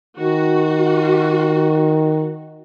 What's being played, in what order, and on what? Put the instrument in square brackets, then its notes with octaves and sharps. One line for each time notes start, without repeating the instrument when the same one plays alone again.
[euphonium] D#3 [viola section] F#4